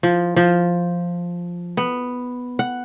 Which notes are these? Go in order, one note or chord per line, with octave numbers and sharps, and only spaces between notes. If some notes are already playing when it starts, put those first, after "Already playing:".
F3
F3
B3
F#5